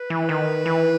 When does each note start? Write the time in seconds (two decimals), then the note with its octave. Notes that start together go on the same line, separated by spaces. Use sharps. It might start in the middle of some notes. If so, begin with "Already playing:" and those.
Already playing: B4
0.10 E3
0.29 D#3
0.66 E3